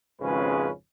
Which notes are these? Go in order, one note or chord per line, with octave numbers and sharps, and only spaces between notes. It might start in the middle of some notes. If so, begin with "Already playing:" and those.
G#1 F2 C#3 G#3 C#4 B4